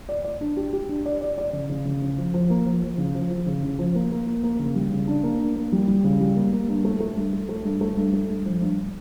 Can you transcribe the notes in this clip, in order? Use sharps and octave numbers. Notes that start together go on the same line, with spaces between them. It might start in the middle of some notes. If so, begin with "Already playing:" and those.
D5
D5
D4
G4
G4
D4
D5
D5
D5
C#3
C#3
C#3
C#3
F3
F3
A#3
F3
F3
C#3
F3
F3
C#3
C#3
F3
A#3
A#3
A#3
A#3
C#3
G3
C#3
D4
A#3
D4
A#3
G3
G3
C#3
G3
A#3
A#3
G2
A3
A3
G2
A3
A3
G2
A3
G2
A3
G2
F3
G2